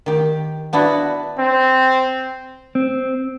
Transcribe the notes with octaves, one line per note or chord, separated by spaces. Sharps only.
D#3 G4
B3 D4 E4 F#4
C4
C4